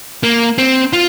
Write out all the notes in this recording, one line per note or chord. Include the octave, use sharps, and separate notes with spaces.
A#3
C4
F4